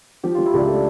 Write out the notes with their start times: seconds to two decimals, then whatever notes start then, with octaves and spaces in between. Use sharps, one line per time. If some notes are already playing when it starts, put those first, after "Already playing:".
0.23 F3 G4
0.35 F3 F4
0.46 E4
0.53 C#2 D4
0.68 A3